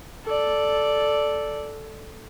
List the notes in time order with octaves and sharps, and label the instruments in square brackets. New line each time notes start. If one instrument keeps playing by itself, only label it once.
[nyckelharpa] A4 D5